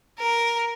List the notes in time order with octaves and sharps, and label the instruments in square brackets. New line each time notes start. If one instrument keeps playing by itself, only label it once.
[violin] A#4